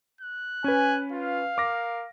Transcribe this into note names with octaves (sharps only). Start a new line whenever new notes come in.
F#6
C#4 B4 G#5
F4 F5
A#4 D6 A#6